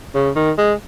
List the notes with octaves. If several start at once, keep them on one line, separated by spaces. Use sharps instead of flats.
C#3
D#3
G#3